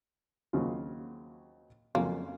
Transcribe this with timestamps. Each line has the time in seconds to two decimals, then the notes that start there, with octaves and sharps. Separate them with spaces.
0.53 D#2 C#3 F#3 C4 F4
1.95 F2 C#3 F#3 A#3 C#4 F4